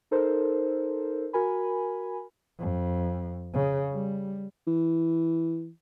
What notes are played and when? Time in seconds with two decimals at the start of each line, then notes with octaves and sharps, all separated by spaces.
0.11 D#4 A4 A#4 C5
1.33 F#4 A#4 G#5 B5
2.59 F2
3.54 C#3
3.93 G3
4.67 E3